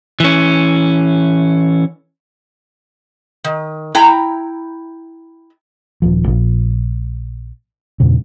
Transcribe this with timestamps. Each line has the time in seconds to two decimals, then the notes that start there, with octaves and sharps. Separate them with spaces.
0.20 E3 C#4
3.44 D#3
3.95 E4 G5 A#5
6.02 D#1 F3
6.27 A#1 A#2
8.00 E2 G2 A#2 C#3